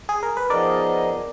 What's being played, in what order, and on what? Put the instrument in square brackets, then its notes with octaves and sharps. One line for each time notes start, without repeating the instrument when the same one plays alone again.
[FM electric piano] G#4
A#4
B4
[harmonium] F3 B3 D#4 G#4 D#5 [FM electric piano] A#4 D5